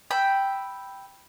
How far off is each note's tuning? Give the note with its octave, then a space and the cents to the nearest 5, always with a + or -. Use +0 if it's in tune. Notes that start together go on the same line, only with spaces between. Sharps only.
G5 +0 B5 +0 E6 +0